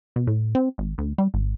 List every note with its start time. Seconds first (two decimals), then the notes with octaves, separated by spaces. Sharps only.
0.16 B2
0.27 A2
0.55 C4
0.78 G#1
0.98 D2
1.18 G3
1.34 G#1